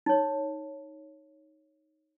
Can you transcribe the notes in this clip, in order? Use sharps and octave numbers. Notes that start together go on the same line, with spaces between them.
D#4 C#5